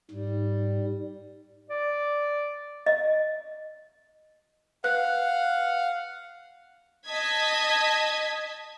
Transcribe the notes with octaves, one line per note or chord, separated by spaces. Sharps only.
G#2 G3
D5
D#5
B4 F5 F#5 F#6
D#5 A5 G#6 B6